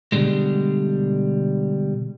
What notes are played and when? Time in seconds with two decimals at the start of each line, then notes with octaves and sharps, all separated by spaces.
0.12 B2 D3 G3 G#3